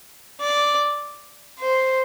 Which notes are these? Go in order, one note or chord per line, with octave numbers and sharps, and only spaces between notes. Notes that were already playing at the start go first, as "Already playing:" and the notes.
D5
C5